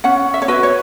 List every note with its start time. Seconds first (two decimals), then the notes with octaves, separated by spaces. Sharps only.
0.04 C#4 F#5
0.34 E5
0.42 C#5
0.48 F#4 B4 E5
0.63 C#5